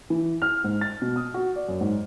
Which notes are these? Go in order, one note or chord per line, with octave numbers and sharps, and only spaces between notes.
E3
F6
G#2
A6
B2
D#6
F#4
D5
F#2
G#2